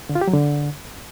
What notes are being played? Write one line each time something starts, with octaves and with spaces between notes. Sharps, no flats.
D3
F4
G4
F#3
D3